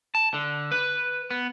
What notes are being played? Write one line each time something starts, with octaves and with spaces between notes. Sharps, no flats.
A5
D3
B4
B3